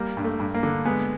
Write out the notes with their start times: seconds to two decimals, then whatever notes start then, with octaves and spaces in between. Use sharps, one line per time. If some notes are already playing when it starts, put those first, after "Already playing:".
Already playing: G3 A#3
0.17 G2
0.24 A3
0.40 G2
0.54 A#3
0.63 D3
0.85 G#3 B3